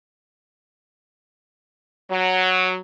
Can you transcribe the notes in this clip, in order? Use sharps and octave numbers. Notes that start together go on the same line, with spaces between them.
F#3